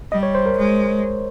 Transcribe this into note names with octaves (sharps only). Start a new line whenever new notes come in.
G3 D#5
C#5
C5
A#4
G#3